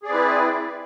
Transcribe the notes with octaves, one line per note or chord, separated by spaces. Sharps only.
C4 E4 G#4 B4 D5